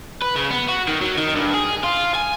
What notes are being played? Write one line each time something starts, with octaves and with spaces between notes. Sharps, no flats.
B4
C#3
B3
F#4
D#3
F#3
D#3
G2
G#4
F4
G#5